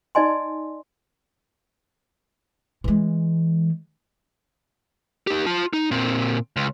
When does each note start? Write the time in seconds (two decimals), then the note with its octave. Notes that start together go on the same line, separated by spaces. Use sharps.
0.15 D#4 D5 D#5 G#5 C6
2.84 E3 G#3
5.27 D#4 G4
5.46 F4 A5
5.73 D#4
5.91 A#2 C4
6.56 C#2